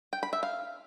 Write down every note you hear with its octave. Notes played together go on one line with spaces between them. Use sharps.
G5
B5
E5
F5